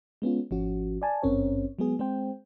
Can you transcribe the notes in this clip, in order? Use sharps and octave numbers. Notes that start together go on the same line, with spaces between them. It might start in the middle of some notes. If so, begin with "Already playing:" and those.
G#3 B3 C#4 F4
G#1 F3 C#4 F#4
D5 G#5 A5
G#1 G2 C4 C#4 A#4 C#5
F#3 G#3 B3 G#4
G#3 C4 C5 G5